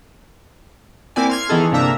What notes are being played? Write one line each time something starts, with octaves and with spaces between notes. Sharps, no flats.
A#3 C4 E4 D5 G#5
C6 F6 G#6
D#3 E3 B3 D#4 G#4 A4
G1 C3 A#3 D4 E5 A#5